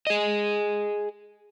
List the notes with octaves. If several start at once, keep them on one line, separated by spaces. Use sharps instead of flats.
G#4 D#5